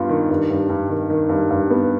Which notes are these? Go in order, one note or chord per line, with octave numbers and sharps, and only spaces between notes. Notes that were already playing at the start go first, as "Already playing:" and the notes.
Already playing: G2 B3 F4
D#3
G2
G2
G2
D#3
D#3
G2
G2
B3